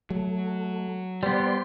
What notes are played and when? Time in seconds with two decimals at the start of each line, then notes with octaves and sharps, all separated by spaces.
0.10 F#3 A3
1.23 G3 B3 C5 D5 C6